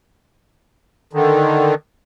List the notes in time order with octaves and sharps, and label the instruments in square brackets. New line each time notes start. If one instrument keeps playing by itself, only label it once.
[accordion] D3 D#3